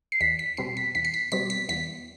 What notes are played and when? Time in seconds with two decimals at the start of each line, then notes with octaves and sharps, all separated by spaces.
0.12 C7
0.21 E2 B6
0.39 B6
0.57 B2 G3 C4 C7
0.77 B6
0.95 E2 B6
1.05 C7
1.14 B6
1.32 B2 G3 C4 B6
1.50 B6
1.69 E2 B6